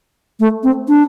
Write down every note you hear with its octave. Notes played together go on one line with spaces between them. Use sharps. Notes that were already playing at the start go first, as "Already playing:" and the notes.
A3
C4
D4